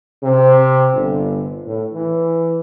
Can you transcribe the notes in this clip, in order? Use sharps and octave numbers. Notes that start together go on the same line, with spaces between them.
C3
G1
A2
E3